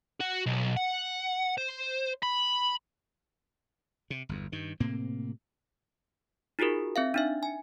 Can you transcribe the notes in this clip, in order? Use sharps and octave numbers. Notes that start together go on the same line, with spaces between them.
F#4
B1
F#5
C5
B5
C3
G1 E2
G2 D#3
A2 C3 A#3 C4
D#4 F4 F#4 G#4 A#4
C4 E5 F5
D4 D#4 E5
G#5